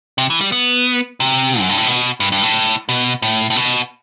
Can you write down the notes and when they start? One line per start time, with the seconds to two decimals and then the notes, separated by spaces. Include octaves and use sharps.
0.18 C3
0.30 E3
0.41 G3
0.52 B3
1.20 C3
1.60 F#2
1.69 G2
1.77 A2
1.86 B2
2.20 G2
2.32 G2
2.43 A2
2.89 B2
3.22 A2
3.50 A2
3.56 B2